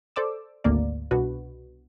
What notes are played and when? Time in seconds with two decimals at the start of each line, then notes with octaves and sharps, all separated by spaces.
0.16 A4 C5 D5 D6 E6
0.64 G#1 D2 A#3 D5
1.11 C2 B2 B3 D4 F#4 B4